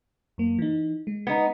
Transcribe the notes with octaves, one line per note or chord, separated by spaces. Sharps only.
F#2 A#3
E3 D#4
G#3
B3 D#4